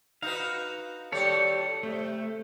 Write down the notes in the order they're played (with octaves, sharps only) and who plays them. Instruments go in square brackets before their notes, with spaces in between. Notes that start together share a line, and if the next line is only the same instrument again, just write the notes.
[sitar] D#4 F#4 B4 [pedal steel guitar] F5
[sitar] D#2 G3 D5 [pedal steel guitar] A4 C#5
[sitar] C3 [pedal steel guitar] A3